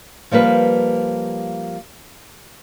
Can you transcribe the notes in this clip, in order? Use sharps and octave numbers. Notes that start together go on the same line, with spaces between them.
F3 G3 A#3 B4